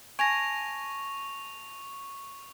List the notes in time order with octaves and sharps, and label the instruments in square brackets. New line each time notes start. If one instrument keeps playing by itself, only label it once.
[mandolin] G#5 [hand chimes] A5 A#6 D7 [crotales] C#6 F7